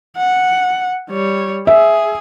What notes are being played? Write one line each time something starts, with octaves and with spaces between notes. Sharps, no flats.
F#5
G3 C#5
G#4 E5